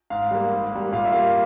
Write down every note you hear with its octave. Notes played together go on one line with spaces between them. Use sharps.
G#2 F5
G3 A#3
G#2
G3 A#3
A#2 F5
E5
G3 A#3 F5